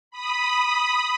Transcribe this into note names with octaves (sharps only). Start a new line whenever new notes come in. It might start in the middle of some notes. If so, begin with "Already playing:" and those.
B5 D#6